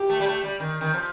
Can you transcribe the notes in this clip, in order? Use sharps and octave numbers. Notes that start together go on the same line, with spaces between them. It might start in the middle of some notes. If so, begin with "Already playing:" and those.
Already playing: G4
A3
G3
A3
G3
D#3
D#3
F3